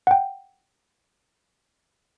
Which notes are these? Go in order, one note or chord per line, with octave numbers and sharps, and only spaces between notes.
F#5 G5